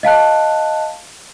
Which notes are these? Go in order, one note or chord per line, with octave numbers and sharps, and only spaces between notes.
D#5 F5 A5 F#6